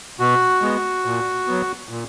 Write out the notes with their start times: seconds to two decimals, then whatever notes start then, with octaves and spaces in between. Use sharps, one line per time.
0.20 B2 F#4
0.62 G#3 B3
1.05 A#2
1.47 F#3 B3
1.89 A#2